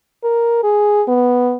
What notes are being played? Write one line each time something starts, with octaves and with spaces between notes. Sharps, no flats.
A#4
G#4
B3